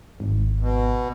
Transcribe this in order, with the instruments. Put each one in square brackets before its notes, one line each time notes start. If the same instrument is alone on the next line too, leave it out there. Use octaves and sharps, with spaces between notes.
[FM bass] G#1
[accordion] B2